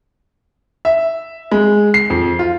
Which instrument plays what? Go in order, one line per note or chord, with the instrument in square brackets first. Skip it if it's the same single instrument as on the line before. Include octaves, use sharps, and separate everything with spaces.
[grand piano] E5
G#3
C7
F2
F4